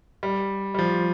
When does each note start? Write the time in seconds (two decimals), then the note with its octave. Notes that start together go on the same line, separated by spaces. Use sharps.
0.23 G3
0.75 G3
0.79 F3